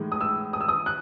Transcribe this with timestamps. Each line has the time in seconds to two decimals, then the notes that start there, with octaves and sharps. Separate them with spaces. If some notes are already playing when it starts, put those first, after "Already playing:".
Already playing: A2 E3 G#3 D#4
0.12 D#6
0.21 E6
0.53 D#6
0.61 E6
0.69 D#6
0.86 F#6